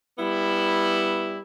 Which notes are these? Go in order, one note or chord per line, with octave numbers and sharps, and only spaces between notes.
G3 B3 E4